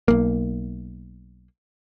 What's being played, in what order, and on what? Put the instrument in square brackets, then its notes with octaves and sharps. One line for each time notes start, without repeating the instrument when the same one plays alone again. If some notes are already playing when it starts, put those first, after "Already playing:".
[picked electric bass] B1 A#3